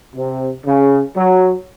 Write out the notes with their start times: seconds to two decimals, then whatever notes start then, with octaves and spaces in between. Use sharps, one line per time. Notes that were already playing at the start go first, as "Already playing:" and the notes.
0.15 C3
0.65 C#3
1.15 F#3